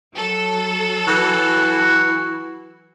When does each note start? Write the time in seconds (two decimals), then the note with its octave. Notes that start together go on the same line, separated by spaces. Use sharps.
0.15 F#3 A4
1.08 E3 F#4